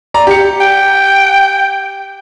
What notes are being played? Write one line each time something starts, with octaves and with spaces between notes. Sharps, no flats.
D5 A#5
G4 C#7
G5